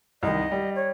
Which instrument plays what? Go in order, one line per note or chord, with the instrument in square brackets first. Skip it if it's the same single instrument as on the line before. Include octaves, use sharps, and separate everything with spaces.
[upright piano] C2 D#3 [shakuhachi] D#5
[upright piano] G3
[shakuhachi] C#5